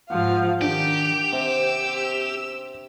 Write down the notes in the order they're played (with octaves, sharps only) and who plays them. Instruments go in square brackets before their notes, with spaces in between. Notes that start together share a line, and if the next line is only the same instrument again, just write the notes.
[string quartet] G#2 F3 F5 [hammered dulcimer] F#5
[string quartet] D#3 G6 [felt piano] D4 [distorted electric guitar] G4
[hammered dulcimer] C3 [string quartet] E6